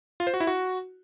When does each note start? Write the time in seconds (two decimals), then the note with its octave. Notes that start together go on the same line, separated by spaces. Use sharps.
0.20 F4
0.27 C5
0.34 F#4
0.40 E4
0.47 F#4